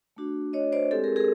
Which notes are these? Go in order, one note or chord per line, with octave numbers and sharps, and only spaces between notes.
A3 D4 F#4
C#5 D#5
C5 D5
G#3 C4 E4 G4 A4
G#4 A#4
G#4 A#4